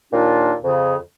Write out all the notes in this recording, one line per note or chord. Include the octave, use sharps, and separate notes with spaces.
D#2 A#2 D4 F4
F2 C#3